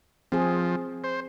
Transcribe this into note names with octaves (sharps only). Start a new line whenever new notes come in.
F3 C4 G#4
C5